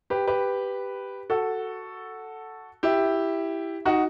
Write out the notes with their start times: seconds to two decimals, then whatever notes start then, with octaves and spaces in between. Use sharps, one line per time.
0.10 G4 B4
0.27 G4 B4
1.30 F#4 A4
2.83 E4 G4
3.85 D#4 F#4